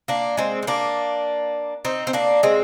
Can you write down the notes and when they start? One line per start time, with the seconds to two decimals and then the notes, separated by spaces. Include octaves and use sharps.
0.08 A#3 D4
0.37 G#3 C4
0.63 C4
0.67 A#3 D4
1.85 C4 D#4
2.07 C4
2.13 A#3 D4
2.43 G#3 C4